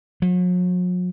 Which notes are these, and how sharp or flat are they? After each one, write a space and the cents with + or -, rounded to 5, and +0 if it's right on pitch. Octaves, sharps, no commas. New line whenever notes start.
F#3 -45